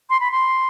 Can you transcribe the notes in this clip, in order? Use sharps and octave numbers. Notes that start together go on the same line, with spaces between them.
C6
B5
C6